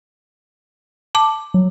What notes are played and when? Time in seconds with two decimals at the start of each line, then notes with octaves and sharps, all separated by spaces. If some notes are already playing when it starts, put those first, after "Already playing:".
1.15 A5 D6
1.54 F#3